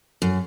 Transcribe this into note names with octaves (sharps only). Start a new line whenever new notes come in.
F#2